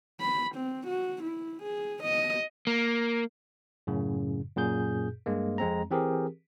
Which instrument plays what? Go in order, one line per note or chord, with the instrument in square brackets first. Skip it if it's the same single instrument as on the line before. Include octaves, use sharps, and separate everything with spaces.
[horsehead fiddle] B5
C4
F#4
E4
G#4
D#5
[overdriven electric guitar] A#3
[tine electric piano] F#2 A2 C#3
F#2 A#2 G#4 G6
G2 G#3 A#3
F2 G#3 C4 A#5
E3 C4 G4 G#4 A#4